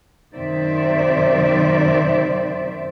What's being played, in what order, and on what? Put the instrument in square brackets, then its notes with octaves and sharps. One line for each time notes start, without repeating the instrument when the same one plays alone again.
[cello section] F#2 C3 D#3 C5 D5 E5